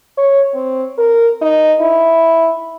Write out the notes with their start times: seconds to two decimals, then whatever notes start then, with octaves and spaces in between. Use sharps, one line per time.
0.18 C#5
0.55 C4
0.98 A#4
1.42 D#4
1.81 E4